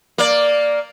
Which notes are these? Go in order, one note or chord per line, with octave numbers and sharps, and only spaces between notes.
A#3 D5